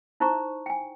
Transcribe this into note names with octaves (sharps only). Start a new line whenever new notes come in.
D#4 E4 C5 A#5 C#6
G5 G#5